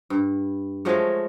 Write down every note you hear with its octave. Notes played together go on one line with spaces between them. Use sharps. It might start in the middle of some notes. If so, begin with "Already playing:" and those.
G2
F3 F#3 G#3 A3